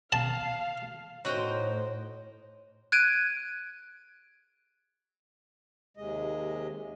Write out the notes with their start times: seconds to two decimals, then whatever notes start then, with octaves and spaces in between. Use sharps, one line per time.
0.12 F5 A5
1.25 A2 D#4 F#4 A#4 C5 C#5 F#5 G5
2.92 F#6 G#6 D7 D#7
5.97 D#2 C3 G#3 D#5